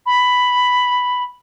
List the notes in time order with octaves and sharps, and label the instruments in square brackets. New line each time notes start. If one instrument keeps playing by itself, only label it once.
[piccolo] B5